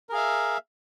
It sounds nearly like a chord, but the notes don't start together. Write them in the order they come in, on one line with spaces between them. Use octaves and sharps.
A#4 G#4 F5 E5